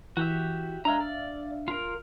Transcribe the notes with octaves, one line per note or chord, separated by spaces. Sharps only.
E3 F#4 G4 E5
G#3 D4 E5 F5 A#5
D5
F4 A#4